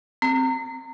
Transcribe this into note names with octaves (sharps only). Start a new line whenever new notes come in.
C4